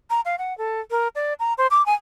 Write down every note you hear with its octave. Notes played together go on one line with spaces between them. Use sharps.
A#5
F5
F#5
A4
A#4
D5
A#5
C5
D6
G#5